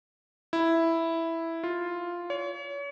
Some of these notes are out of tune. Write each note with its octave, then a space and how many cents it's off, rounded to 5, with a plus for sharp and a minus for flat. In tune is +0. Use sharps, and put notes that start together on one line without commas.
E4 +0
F4 +0
C#5 +35